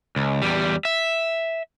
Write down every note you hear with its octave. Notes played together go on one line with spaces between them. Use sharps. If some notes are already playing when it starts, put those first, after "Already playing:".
C#2
E2 G3
E5